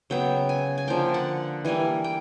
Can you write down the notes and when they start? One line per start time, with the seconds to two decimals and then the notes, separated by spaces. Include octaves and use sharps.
0.10 C#3 F#3 B3 G5
0.49 G#5
0.78 G#5
0.87 D3 F3 A#3 G5
1.14 F#5
1.65 E3 G3 A#3 G#5
2.04 G5